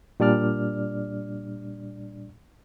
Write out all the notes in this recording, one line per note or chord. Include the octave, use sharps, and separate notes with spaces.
A#2 G3 D4 D5 F6